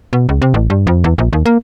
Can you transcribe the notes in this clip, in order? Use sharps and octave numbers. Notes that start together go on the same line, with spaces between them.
B2
C#2
C3
A1
G2
F2
E2
A#1
D#2
A#3